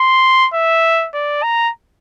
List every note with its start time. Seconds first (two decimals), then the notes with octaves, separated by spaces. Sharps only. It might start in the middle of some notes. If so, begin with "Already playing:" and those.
Already playing: C6
0.54 E5
1.14 D5
1.43 A#5